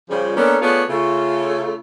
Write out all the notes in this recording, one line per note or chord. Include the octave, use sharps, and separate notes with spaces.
C#3 F3 G3
A#3 B3 C#4 D4 A4 A#4
A3 B3 F4 G#4 C#5 D5
C#3 A3 F4